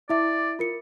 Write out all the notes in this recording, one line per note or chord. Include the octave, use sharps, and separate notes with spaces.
E4 D5 E5 D6
F4 A#4 C#7